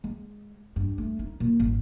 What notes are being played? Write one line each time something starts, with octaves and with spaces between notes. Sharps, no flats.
G#3
G2
A3
D#4
A#2
G#1